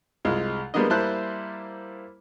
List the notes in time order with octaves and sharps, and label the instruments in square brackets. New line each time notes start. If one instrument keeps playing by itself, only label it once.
[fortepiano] C2 G#3 F4
G3 G#3 A#3 B3 D4 D#5
G3 A#3 E4 C5 A5 F#6